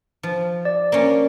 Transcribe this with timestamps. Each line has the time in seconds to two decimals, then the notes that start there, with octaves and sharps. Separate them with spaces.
0.23 F3
0.65 D5
0.92 A#3 C#4